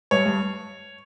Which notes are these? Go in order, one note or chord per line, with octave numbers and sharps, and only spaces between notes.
G2 C#5
G2